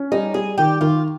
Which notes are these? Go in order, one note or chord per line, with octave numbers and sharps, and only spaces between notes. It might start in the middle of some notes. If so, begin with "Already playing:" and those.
Already playing: C#4
G3 D#4
G3 G#4
D#3 G4
D#3 F4